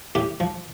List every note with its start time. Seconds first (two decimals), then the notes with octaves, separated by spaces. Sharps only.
0.15 A2 G4
0.40 F3